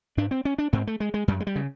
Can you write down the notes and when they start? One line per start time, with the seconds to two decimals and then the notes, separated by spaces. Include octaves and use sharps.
0.17 G#2 D4
0.31 C4
0.45 C#4
0.58 D4
0.73 G#2 C4
0.87 A3
1.00 G#3
1.14 G#3
1.28 F#2 G3
1.40 G#3
1.47 G3
1.56 C#3